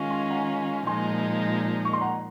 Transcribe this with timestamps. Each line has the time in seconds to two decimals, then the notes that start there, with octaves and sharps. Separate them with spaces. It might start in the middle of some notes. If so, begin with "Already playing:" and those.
Already playing: D#3 G#3 C#4 F4
0.10 G#5 C6
0.30 F#5 A#5
0.87 A#2 F3 G#3 D#4 G#5 C6
1.85 C#6
1.93 C6
2.01 F#5 A#5